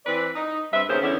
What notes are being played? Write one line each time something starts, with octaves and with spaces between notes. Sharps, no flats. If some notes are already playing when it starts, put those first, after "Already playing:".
E3 C4 B4 D5
D#4
G2 C4 B4 E5
D#2 C#3 B3 A#4 C5
E2 D3 B3 C#4 E4